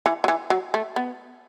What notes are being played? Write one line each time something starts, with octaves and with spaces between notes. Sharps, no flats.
E3
F#3
E3
F#3
A3
B3